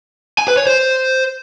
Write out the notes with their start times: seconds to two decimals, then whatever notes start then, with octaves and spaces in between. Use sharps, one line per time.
0.38 G#5
0.48 B4
0.57 C#5
0.67 C5